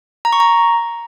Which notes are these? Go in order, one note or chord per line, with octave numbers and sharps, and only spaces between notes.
A#5
C#6
A#5